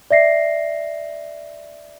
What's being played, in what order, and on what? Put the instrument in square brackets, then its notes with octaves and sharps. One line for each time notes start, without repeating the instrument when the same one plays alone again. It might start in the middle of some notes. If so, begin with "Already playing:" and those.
[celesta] D5 E5 A#6 C7